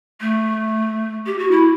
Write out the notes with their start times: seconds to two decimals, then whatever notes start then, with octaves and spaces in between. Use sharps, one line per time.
0.21 A3
1.26 G4
1.39 F#4
1.51 E4